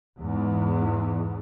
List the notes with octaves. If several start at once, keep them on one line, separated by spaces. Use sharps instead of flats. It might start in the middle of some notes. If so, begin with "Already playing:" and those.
E2 G#2